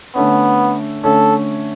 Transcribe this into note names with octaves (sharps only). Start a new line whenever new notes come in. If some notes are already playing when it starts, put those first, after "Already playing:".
D3 A3 B3 C#4
D3 A3 C#4 A4